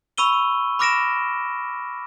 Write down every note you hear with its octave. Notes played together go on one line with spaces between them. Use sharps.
B5 C#6 E6 D#7 G7
B5 D6 F6 A#6 D7 E7